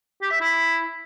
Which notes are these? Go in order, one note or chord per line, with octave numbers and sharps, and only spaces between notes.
G4
E5
E4